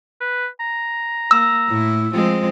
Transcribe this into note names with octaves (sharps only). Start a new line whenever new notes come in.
B4
A#5
A#3 E6
A2 E4
F3 G#3 C4